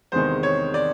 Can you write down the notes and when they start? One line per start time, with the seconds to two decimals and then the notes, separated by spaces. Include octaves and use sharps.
0.12 E2 C3 D#3 G#3 C5
0.43 C#5
0.74 D5